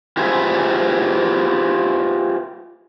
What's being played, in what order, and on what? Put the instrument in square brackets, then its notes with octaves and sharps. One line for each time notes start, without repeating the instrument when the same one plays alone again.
[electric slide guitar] F4 G4 G#4 B4 C5 E5